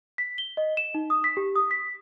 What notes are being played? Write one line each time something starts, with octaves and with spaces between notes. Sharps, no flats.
B6
G7
D#5
E7
D#4
D#6
B6
G4
D#6
B6